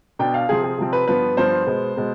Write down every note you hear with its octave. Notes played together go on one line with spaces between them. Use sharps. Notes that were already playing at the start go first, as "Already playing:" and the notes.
B2 B3 D4 G5
F5
C3 F3 C4 G#4
G#4
C3 F3 C4
B4
G2 F3 B3 B4
G2 F3 B3 C5
B2 G#3 B3
B2 G#3 B3